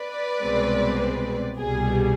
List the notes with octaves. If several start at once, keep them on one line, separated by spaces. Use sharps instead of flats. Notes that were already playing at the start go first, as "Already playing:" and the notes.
Already playing: B4 D5
C2 B2 G#3 C4
C2 B2 G3 G#4